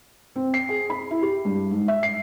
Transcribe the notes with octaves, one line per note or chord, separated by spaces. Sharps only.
C4
C7
G#4
B5
E4
G4
G2
G#2
E5
C7